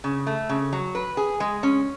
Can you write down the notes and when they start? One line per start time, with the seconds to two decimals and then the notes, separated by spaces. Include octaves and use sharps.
0.04 C#3
0.27 A3
0.49 C#3
0.73 F#3
0.95 B4
1.17 G#4
1.40 G#3
1.63 C#4